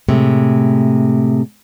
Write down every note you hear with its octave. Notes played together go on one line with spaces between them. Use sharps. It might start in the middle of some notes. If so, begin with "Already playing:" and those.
A2 C3 G#3 A3